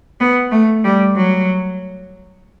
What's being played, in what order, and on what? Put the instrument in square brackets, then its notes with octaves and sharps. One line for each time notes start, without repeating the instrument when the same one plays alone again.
[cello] B3
A3
G3
F#3